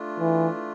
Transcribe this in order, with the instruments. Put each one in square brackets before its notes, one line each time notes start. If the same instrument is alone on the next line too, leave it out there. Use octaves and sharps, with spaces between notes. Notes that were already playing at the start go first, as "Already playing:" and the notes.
Already playing: [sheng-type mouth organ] A3 D4 F4
[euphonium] E3